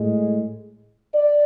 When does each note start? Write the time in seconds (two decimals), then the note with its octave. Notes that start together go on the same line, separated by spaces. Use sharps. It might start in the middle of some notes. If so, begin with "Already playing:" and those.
Already playing: A2 G#3
1.14 D5